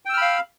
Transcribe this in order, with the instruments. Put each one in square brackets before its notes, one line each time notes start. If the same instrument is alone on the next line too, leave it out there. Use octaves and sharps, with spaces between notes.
[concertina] G5
E6
F6
B5
F5